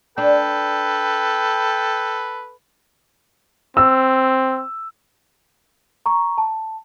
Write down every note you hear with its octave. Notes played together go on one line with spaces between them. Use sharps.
D4 A4 B4 G5
C4 E6
A#5 C#6
A5